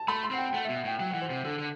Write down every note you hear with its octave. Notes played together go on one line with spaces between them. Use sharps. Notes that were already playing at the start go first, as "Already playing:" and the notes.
Already playing: A5
A3 B5
C6
C4 F#5
G5
G5
A3 F#5
E5
B2
F#5
A2 G5
F#3 G5
F#5
E3
C5
C3
D3 A4
D3